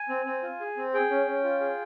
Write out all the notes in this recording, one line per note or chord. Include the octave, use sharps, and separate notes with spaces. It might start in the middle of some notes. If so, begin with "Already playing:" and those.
Already playing: G#5
C4
C4
F4
G#4
C4
G#4 G5
C#4
C#4
F4
G#4